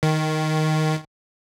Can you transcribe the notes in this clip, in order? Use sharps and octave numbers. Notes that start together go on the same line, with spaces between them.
D#3